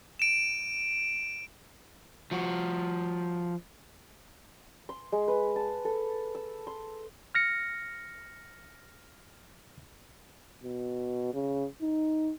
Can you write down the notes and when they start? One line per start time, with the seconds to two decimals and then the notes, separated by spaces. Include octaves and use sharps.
0.19 D7 E7
2.31 F3 F#4
4.89 C6
5.12 G#3
5.28 B4
5.56 A5
5.85 A4
6.35 E6
6.67 C6
7.35 F6 A#6 C#7
10.64 B2
11.34 C#3
11.82 D#4